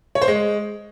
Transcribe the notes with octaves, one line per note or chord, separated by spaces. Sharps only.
C#5
C5
G#3